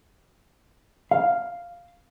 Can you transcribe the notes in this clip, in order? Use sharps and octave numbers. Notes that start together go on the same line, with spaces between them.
F5